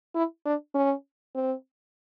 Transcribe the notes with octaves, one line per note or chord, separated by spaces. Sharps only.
E4
D4
C#4
C4